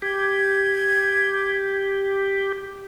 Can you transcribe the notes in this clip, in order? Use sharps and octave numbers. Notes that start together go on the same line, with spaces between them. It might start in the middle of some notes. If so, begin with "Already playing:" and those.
G4 G#6